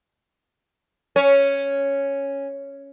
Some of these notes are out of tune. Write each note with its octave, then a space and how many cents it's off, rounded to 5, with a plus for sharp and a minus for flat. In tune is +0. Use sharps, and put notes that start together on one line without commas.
C#4 +0 C#5 +0